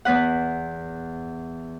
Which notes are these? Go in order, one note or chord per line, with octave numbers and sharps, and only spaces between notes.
E2 B3 B4 F#5